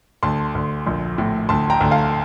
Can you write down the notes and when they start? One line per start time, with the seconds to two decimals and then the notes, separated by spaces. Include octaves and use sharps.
0.23 D2 A5 C6
0.55 D2
0.87 A#1
1.18 A2
1.49 D2 A5 C6
1.70 G5 A#5
1.80 D2
1.91 F5 A5